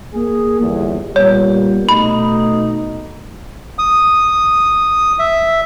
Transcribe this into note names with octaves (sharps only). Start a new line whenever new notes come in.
A#3 G#4
G1 E2
A#2 G3 B3 C#5
B2 A3 D#4 B5
D#6
E5